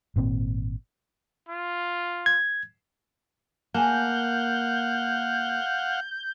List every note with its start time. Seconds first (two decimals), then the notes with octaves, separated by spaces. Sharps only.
0.16 G#1 A#2 C4
1.49 F4
2.26 G#6
3.74 A#3 G#4 F5 F#5 G#5 A5 G6